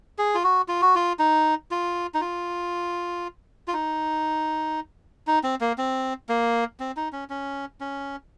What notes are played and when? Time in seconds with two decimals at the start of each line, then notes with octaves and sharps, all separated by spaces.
0.18 G#4
0.35 F4
0.44 F#4
0.68 F4
0.82 F#4
0.95 F4
1.19 D#4
1.71 F4
2.14 D#4
2.21 F4
3.68 F4
3.73 D#4
5.27 D#4
5.43 C4
5.61 A#3
5.78 C4
6.29 A#3
6.80 C4
6.97 D#4
7.12 C#4
7.30 C#4
7.80 C#4